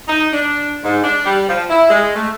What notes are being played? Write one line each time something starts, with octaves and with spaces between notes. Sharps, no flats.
D#4
D4
G#2
D4
G3
F3
E4
G#3
A3